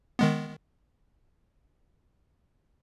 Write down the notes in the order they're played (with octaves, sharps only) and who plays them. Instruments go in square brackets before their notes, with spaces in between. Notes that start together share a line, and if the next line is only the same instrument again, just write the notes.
[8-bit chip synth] D#3 G#3 B3